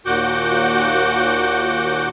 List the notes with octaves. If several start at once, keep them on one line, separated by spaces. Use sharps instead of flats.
D#2 A#2 F#4 F#5 D6 G6